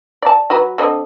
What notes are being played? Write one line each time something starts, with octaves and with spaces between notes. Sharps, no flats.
D5 A5
F#3 F#4 B4
D3 C4 D#5